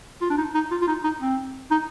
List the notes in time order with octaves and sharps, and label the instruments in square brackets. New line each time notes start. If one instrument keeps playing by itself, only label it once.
[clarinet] F4
D4
D#4
D#4
F4
F4
D#4
D#4
C4
D#4